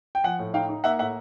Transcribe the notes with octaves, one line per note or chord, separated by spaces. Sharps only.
G5
F3 F#5 G#5
A2
D#4 F5 G5
D#4
A#3 E5 F#5
A2 E5 F#5